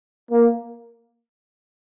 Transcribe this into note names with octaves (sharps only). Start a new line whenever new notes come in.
A#3